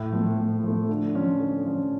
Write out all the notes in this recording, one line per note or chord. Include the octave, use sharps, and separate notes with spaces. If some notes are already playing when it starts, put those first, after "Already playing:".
Already playing: A2
F3 A3
A2
F3 A3
D3
F3 C#4
D3
F3 C#4